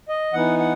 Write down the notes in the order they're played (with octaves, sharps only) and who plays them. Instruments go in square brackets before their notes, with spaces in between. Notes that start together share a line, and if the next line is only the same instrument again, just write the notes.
[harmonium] D#5
E3 B3 D#4 F#5
F#5